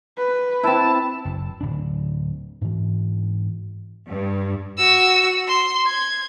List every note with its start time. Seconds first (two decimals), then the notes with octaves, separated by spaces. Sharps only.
0.17 B4
0.63 C4 E4 A5
1.25 F#1
1.61 D1 D4
2.61 G#2 E3
4.08 G2
4.78 F#4 E6
5.48 C6
5.87 G#6